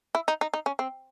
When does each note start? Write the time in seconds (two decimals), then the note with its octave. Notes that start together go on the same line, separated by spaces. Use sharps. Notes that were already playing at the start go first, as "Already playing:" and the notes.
0.15 E4
0.28 D#4
0.41 D#4
0.54 D#4
0.66 C#4
0.79 C4